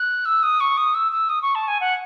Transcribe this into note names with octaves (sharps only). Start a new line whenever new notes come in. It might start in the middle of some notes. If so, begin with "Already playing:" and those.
Already playing: F#6
E6
D#6
C#6
D#6
E6
E6
D#6
C#6
A5
G#5
F#5